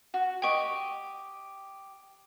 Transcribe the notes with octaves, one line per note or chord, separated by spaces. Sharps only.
F#4
G4 D#5 G5 C#6 D7